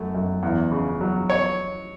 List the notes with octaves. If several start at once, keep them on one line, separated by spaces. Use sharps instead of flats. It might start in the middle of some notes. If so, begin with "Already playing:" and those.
Already playing: F#2 A3
F#2
E2
C#3
F#3
C#5